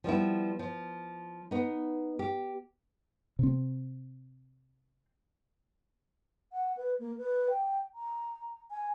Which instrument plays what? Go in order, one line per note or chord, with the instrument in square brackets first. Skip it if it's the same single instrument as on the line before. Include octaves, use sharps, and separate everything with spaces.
[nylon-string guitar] F3 G3 B3 E4
F3
B3 D#4
G4
[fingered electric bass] C3 C4
[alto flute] F#5
B4
A#3
B4
G5
A#5
G#5